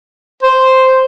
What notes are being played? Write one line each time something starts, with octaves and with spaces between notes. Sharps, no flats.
C5